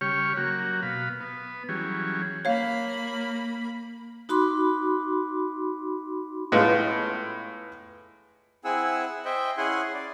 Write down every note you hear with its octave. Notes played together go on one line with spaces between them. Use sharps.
C#3 G3 G4 C#5 C#6 F6
F#3 A#3 F#4
B2 F5 B5
B3
E3 F#3 G3 C#4 G#4
A#3 C#5 F5 B5
D#4 F#4 B5 C6 D6
A2 G#3 B3 F4
C4 E4 G#4 F#5 G#5 E6
C5 D#5 E5 G5
C#4 E4 G#4 F#5 G#5 C6
D5